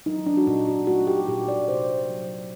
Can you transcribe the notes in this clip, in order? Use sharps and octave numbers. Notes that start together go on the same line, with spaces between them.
F#3 D#4
D4
F#4
A#2 D#4
F#4
A3 F#4
G4
A#2 G4
D5
C3 C5
F#3